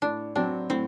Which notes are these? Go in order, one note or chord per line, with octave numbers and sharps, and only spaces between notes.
A2 D4
F#3 C4 D4
A2 C4